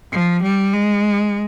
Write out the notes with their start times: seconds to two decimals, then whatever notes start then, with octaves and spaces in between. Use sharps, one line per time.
0.12 F3
0.43 G3
0.73 G#3